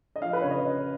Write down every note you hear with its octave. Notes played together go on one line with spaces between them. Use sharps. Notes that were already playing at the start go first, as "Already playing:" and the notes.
D#5
F3 F5
B4
C#3 C#5
D#5